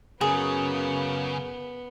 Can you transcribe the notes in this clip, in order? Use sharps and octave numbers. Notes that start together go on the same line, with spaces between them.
F#2 C#3 B3 G#4